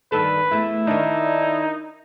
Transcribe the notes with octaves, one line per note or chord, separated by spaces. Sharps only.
G2 D#3 A4 B4
E2 A3 E4
D#3 D4 D#4